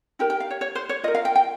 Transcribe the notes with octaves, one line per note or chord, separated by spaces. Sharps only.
D#4 G4 A#4 G5
G5
F5
C#5
C#5
C5
C#5
F4 A#4 D#5
F5
G5
G5